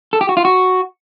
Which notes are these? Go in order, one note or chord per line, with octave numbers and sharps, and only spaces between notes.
A4
G4
F#4
F4
F#4